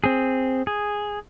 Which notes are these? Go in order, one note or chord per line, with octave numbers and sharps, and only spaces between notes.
C4 G#4
G#4